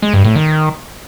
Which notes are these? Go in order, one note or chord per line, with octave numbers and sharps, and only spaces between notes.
G#3
G2
A2
D#3